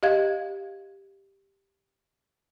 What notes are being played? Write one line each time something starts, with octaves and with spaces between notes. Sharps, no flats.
G4 D#5 F5 G#6